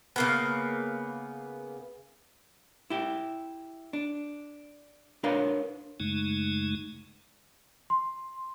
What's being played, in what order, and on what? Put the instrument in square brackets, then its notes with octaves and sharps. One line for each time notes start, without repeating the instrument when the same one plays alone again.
[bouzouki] C#3 A#3 B3
[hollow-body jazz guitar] E4 G4
D4
D4 A#4 B4 C#5 F5
[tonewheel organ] F#2 C#3 G#3 A3 D#4
[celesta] C6